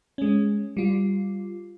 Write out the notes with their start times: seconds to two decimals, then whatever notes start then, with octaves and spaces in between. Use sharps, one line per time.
0.18 G#3 C#4
0.77 G3 F4